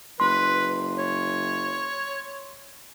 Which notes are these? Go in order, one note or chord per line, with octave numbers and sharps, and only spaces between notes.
F#1 B4 C6
C#5